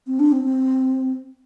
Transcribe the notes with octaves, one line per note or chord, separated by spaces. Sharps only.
C4
D4
C4
C4